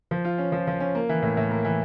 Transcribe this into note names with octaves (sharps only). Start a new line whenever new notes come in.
F3
F4
C#4
F3
F3
C#4
A#3
E3
A2
A2
A#3
E3